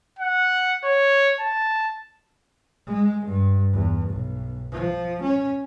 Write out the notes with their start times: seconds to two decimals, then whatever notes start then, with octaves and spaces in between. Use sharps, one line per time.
0.19 F#5
0.85 C#5
1.40 A5
2.87 G#3
3.26 G2
3.73 E2
4.09 B1
4.72 F3
5.22 C#4